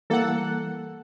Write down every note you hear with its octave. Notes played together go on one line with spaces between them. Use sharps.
E3 G3 A#3 A4 F#5